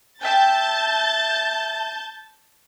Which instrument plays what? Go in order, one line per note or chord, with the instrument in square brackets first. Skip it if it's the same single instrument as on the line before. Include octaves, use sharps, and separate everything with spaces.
[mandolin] E5 G5 [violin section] A5 G6 A6